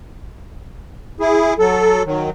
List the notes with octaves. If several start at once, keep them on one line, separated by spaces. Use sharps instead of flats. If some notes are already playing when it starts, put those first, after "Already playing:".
E4 G#4
F#3 A4
D#3 F#3